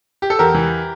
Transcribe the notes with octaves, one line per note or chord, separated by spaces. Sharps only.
G4
A4
E2 G4 A#4
E3